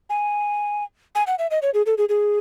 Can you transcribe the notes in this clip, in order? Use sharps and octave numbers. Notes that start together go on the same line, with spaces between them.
G#5
G#5
F#5
E5
D#5
C#5
G#4
A4
G#4
G#4